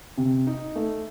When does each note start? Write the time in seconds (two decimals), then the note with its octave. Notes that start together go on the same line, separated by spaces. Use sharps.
0.17 C3
0.47 D#4
0.76 A3